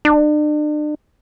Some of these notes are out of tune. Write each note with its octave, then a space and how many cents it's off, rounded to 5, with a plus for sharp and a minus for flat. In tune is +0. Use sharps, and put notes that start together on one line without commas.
D4 +40